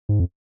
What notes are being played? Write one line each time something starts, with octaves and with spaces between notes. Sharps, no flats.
G#2
F2